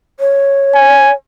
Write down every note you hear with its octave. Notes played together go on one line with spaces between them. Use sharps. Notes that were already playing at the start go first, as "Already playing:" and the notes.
C#5
G#5